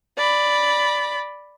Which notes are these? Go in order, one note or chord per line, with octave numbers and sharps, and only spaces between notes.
D5 B5